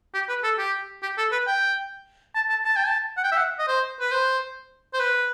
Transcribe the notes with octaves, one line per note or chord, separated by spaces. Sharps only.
G4
B4
A4
G4
G4
A4
B4
G5
A5
A5
A5
G5
A5
F#5
G5
E5
F#5
D#5
C5
B4
C5
C5
B4